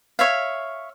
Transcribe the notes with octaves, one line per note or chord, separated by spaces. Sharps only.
C#5 E5 F5